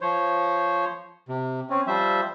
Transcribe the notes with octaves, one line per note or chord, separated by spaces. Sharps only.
F3 C5 C#5
C3
C4 C#4
F3 G3 C5 E5